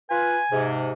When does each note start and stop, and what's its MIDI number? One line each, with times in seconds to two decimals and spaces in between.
0.10 0.38 65
0.10 0.38 71
0.10 0.67 80
0.51 0.92 44
0.51 0.92 48